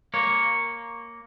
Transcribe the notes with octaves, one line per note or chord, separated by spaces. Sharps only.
A#3 C#5